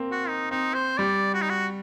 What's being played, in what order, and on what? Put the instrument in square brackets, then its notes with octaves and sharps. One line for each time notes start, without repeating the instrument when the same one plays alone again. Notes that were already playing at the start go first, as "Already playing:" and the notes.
Already playing: [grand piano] A#3 C4
[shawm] F#4
D#4
[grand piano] C4 [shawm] D#4
[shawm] C5
[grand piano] G3 [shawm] D5
[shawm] F#4
D#4
F#4